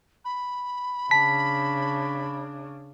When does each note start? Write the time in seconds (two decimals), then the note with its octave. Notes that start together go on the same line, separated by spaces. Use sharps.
0.25 B5
1.11 C#3 D4 A5 B6